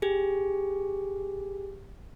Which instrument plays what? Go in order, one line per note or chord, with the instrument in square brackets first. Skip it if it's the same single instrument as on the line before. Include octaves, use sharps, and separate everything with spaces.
[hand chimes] G4 G#4